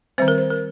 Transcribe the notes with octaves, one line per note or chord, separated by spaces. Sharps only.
D#3 G3 C4 C5
A#4
C5
A#4